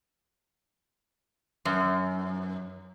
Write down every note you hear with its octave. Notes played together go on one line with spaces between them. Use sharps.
F#2